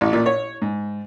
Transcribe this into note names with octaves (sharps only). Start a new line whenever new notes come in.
A1
A#2
C#5
G#2